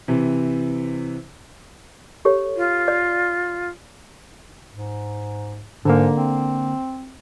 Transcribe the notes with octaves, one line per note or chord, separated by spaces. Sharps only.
C3 E3
G4 A4 C#5
F4
D5
G#2
G#2 D3 A#3
C4